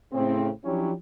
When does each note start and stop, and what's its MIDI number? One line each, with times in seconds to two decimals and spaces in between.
0.13 0.49 45
0.13 0.49 49
0.13 0.49 60
0.64 0.91 53
0.64 0.91 54
0.64 0.91 61
0.64 0.91 62
0.64 0.91 64
0.64 0.91 67